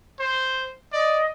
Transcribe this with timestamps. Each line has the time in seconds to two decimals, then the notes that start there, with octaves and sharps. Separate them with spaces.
0.20 C5
0.93 D5 D#5